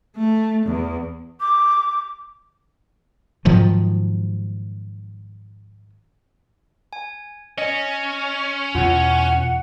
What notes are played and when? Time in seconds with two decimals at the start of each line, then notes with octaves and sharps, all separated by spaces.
0.17 A3
0.66 E2
1.40 D6
3.45 G#2 D#3 F3 F#3
6.93 G#5
7.58 C#4 D#5
8.75 E2 B2 F4 F#5